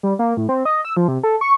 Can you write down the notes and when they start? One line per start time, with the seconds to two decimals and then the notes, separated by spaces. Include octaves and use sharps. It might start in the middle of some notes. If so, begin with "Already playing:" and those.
0.03 G3
0.19 A#3
0.37 A2
0.49 C4
0.65 D#5
0.85 E6
0.97 F3
1.08 C3
1.23 A4
1.41 C#6